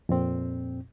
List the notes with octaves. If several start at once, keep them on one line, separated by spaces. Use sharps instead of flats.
F2 A#2 C4